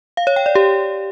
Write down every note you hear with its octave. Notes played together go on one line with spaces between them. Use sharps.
F5
C#5
G5
D5
G4